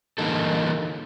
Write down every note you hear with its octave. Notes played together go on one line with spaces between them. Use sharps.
D3 E3 G3 A#3 D#4 A4